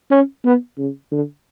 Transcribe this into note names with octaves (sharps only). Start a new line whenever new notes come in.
C#4
B3
C#3
D3